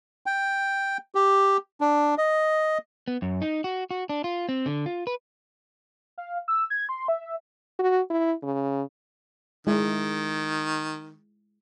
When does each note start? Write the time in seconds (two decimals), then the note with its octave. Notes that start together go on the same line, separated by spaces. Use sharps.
0.26 G5
1.15 G4
1.81 D4
2.18 D#5
3.08 B3
3.22 F#2
3.42 D#4
3.64 F#4
3.91 F#4
4.09 D4
4.24 F4
4.49 C4
4.66 D3
4.86 F4
5.07 B4
6.18 F5
6.48 E6
6.70 G#6
6.89 C6
7.08 E5
7.79 F#4
8.10 E4
8.43 C#3
9.67 D#3 G#3 E4